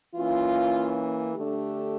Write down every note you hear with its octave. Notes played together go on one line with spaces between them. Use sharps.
E3 A#3 C#4 F4
D3 A3 D4 G4